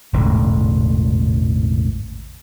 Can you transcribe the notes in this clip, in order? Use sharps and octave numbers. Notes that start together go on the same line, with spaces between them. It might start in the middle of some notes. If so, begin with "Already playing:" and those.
E1 A1 G#2 D3